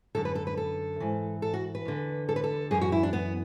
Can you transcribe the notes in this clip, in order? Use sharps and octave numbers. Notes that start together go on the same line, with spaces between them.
F#2 D3 A4
B4
A4
B4
A4
G#2 E3
A4
F#4
B4
E2 D3
A4
B4
A4
F#2 E3 G#4
F#4
E4
D4
B3